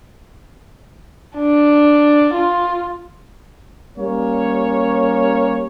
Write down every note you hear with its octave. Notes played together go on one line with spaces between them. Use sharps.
D4
F4
G3 A#3 C#4 C#5